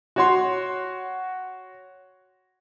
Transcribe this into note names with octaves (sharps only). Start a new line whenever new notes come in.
F#4 C#5 C6